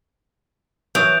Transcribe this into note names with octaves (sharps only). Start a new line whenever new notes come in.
E3 F#3 C#5 D#6 G6 D7 F7